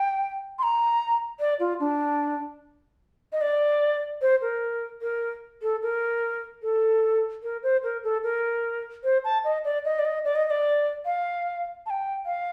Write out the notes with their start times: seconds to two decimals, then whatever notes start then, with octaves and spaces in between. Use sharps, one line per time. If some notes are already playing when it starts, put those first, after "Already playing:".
Already playing: G5
0.59 C6
0.63 A#5
1.40 D5
1.60 F4
1.80 D4
3.32 D#5
3.41 D5
4.22 C5
4.41 A#4
5.02 A#4
5.62 A4
5.83 A#4
6.63 A4
7.43 A#4
7.63 C5
7.83 A#4
8.04 A4
8.24 A#4
9.04 C5
9.24 A5
9.44 D#5
9.65 D5
9.85 D#5
9.99 D5
10.05 D#5
10.25 D5
10.36 D#5
10.46 D#5
10.50 D5
11.06 F5
11.86 A5
11.90 G5
12.26 F5